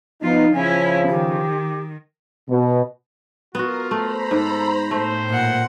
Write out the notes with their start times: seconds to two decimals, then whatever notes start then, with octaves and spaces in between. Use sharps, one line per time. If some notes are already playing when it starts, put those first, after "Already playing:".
0.22 F3 B3 D#4 F4
0.54 C#3 F3 C#4 E4 G#5
1.08 D#3 G4
2.49 B2
3.55 B3 F4 F#4 A#4
3.91 A3 C5 A#5 B5
4.31 G#2 A4
4.91 A2 A3 C5
5.30 A#2 F#5